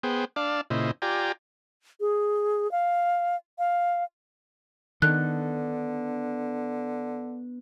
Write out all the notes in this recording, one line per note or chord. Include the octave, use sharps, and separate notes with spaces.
B3 G#4 C5 G5
D4 D5 F5 A5
A#2 C#3 E4 C5 D#5
F4 G4 D5 G5 G#5 A#5
G#4
F5
F5
D3 D#3 B3 D4 A4 F#6